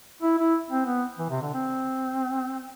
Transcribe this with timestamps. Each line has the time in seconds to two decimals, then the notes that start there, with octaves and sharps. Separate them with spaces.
0.22 E4
0.38 E4
0.70 C4
0.86 B3
1.18 E3
1.30 C3
1.42 D3
1.54 C4